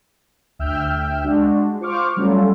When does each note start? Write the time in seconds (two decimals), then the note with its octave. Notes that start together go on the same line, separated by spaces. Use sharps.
0.59 D2 E5 G5 E6 F6 G6
1.24 G#3 D4 F#4
1.80 F4 C5 C#6 D6 F6
2.16 F#3 G3 A3 C#4 F4 A4